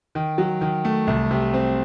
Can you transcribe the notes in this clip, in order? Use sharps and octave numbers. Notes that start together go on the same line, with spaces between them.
D#3
F#3
D#3
A3
C2
C3
C4